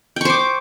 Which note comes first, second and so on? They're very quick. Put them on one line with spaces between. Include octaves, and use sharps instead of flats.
G5 C#6 C5 D6